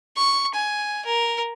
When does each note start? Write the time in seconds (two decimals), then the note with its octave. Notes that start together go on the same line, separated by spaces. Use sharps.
0.17 C#6
0.54 G#5
1.06 A#4